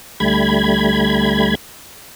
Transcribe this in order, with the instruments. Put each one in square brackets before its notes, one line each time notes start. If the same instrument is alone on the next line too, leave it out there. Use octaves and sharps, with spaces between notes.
[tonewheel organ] D2 G3 A3 B5 G#6